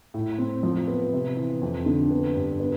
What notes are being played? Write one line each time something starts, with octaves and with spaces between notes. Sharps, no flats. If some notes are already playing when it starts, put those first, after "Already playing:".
A2
C4
F3
B3
C3
E3
F2
D3
B3
G2
B3